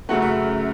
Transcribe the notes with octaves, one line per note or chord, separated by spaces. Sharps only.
F#2 C#3 F#3 A3 F#5
E5